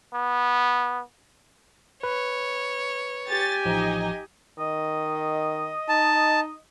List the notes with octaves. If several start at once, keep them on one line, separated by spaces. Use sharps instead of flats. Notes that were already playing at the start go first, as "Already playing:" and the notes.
B3
B4 C#5
G4 G#5 A6
A1 F3 D#4 D#5
D#3 D#5
D#4 A5